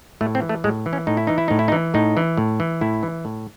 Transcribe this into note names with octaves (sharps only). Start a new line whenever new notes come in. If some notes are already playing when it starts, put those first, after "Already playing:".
A2 A3
C4
E3
A3
A2 G#3
E3
C#4
A2 D#4
E4
E3 D#4
E4
A2 D#4
E4
D#4
E3
A2 D#4
E3
A2
E3
A2 E4
E3
A2